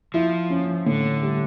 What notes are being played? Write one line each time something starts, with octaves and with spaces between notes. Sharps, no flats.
F3 E4
C#4
A2 D3
G3